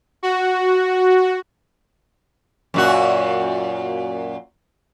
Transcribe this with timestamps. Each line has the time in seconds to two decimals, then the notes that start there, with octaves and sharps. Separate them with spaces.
0.23 F#4
2.74 F#2 A#2 F#4